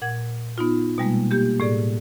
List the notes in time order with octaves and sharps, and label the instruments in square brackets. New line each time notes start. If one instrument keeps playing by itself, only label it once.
[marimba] A#2 F#5 G#6
B3 D#4 F4
B2 G3 G#3 A#3
A#3 G4 G6
A2 G#4 D5